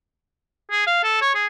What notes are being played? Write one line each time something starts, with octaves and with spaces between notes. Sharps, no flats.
G#4
F5
A4
C#5
G#4